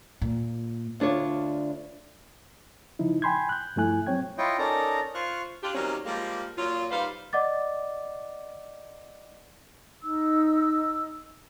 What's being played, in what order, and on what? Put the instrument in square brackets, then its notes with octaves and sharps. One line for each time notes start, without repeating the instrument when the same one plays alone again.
[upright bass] A#2
[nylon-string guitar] D2 D4 F4 C#5
[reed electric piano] C#3 F3 D#4 E4
G5 G#5 B5 C6 G6 G#6
F#6 G6
G2 F3 A3 E4 G#5 F#6
F#3 C4 C#5 G5 G#6
[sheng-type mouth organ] E4 F4 C#5 D#5 G5
C#4 D#4 A4 A#4 D5 A#5
F4 C5 C#6 F6 F#6
[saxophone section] D4 F4 G4
D#3 F#3 G3 A#3 C4 C#4
F3 G3 G#3 A#3
A#2 F#3 C#4 F4
G3 D#4 B4 C5 F5
[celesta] D5 D#5 F#5 D6 A6
[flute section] D#4 E6